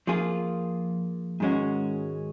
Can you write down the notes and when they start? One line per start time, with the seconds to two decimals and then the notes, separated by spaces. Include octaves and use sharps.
0.07 F3 A#3 F4 G#4
1.40 G#2 D#3 G#3 C#4 F#4